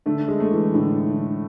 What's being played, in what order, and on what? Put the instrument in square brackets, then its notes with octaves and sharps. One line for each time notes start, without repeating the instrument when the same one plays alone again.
[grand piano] D3 [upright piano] A3
[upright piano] G#3
[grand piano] A3
[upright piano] E3
[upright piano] A2 [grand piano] D3
[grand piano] D3